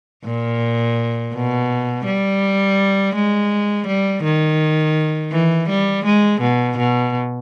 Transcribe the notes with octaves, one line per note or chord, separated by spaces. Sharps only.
A#2
B2
G3
G#3
G3
D#3
E3
G3
G#3
B2
B2